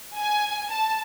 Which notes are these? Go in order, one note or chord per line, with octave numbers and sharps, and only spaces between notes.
G#5
A5